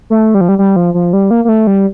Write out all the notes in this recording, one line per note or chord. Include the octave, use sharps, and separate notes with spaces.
A3
G3
F3
G3
G3
F3
F3
G3
A#3
A#3
A3
G3